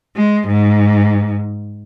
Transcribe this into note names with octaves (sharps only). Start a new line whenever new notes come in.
G#3
G#2